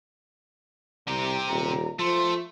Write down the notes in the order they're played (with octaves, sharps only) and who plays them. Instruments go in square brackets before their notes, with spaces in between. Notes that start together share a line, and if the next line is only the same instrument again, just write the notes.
[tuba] C2 [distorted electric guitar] C3 G4 [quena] A#5
[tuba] D#1 [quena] A#5
[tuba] F3 [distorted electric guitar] A3 [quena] C6